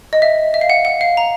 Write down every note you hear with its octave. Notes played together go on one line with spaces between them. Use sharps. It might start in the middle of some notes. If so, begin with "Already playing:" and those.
D#5
E5
E5
F5
F#5
F#5
F5
A#5